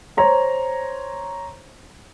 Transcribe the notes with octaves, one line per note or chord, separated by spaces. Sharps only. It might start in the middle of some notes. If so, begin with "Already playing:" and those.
C5 C#5 A#5 C6